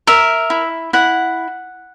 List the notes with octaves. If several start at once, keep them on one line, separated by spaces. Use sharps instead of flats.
A#4 E5
E4
E4 F#5